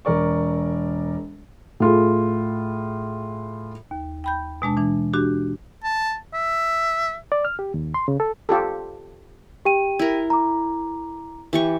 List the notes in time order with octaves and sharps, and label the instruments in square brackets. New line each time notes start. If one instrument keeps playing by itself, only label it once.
[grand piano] E1 A#4 D5 C#6
[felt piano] A2 F4 G#4
[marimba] D#2
G5 B5 G6
B2 G#3 D4 A5
E3 D4
D4 F#4 G4
[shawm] A5
E5
[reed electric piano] D5
F6
G4
D#2
C6
C#3
A4
[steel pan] F4 G4 A4
[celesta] G4 G5 D#7
[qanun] E4 A#4
[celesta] A#5 D6
[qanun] E3 G4 C#6